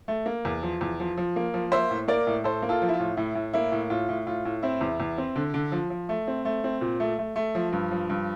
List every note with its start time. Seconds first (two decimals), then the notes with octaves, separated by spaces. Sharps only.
0.08 A3
0.26 A#3
0.45 E2
0.63 F3
0.81 E2
1.00 F3
1.17 F3
1.36 A#3
1.54 F3
1.72 A#3 C5 E5
1.91 A2
2.08 A#3 A#4 D5
2.27 A2
2.44 A2 A4 C5
2.62 A#3
2.69 F4 A4
2.82 F3
2.89 E4
2.94 F4
3.00 A2
3.17 A2 E4
3.35 A2
3.53 A#3 E4
3.72 A2
3.90 A2 F4
4.09 A2
4.26 A2 F4
4.45 A2
4.63 C4 E4
4.81 E2
5.00 E2
5.18 C4
5.36 D3
5.54 D3
5.72 F3
5.90 F3
6.09 A3
6.28 C4
6.45 A3
6.64 C4
6.81 A#2
7.00 A3
7.19 A3
7.36 A3
7.55 F3
7.72 G2
7.91 F3
8.10 G2